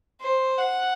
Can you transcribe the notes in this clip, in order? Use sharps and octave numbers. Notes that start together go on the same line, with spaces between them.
C5
F#5